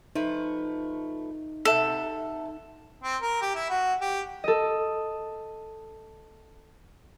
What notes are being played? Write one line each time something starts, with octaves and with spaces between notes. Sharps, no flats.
F3 A3 D#4 B4
C3 A4 E5 F#5
C4
A#4
G4
E4
F#4
G4
A4 D#5